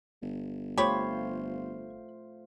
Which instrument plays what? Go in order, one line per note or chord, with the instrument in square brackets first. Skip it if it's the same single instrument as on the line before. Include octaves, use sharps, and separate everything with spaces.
[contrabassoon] G1
[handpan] A3 F4 C5 [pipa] G4 C#5 [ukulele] B5